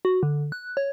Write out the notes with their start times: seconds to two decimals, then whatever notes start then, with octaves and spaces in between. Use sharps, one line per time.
0.05 F#4
0.23 D3
0.52 F#6
0.77 C#5